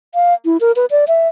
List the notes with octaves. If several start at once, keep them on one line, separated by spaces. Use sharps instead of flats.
F5
E4
A#4
B4
D5
E5